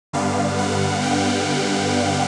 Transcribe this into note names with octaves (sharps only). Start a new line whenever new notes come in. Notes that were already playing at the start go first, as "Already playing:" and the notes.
G2 D3 G3 B3 F5
F#5
G5